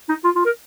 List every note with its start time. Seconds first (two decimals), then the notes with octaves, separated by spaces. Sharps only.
0.09 D#4
0.24 F4
0.36 F4
0.45 A#4